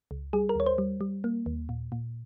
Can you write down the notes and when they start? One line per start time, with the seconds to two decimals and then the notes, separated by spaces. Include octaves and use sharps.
0.11 C#2
0.33 G3 G#4
0.49 A#4
0.56 D#2 C#5
0.66 C5
0.78 G3
1.01 G3
1.24 A#3
1.46 D#2
1.69 A#2
1.92 A#2